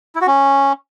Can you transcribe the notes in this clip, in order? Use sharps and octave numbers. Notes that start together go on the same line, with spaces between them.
E4
F#4
C#4